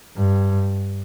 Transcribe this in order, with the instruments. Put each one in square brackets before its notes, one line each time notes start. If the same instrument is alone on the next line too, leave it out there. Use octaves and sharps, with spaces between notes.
[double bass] G2